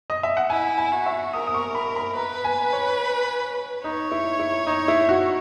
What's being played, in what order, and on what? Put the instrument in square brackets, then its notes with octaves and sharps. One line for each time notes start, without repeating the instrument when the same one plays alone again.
[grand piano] D#5
E5
F#5
[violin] E4 [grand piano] G#5
[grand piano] G#5
[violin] F#4
[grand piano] E5
[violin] A#4 [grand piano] D#6
[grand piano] D#6
C#6
B5
B5
[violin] B4 [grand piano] A#5
[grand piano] G#5
C#5
[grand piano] D#4 [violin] C#5
[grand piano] E4
E4
D#4
E4
F#4